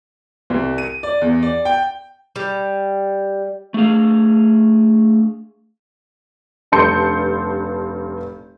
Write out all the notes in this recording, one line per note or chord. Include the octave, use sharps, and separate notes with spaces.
C2
D#7
D5
E2
D5
G5
G3
A3 D4 G#4 F5
F1 G2 A5 C6 G6 C#7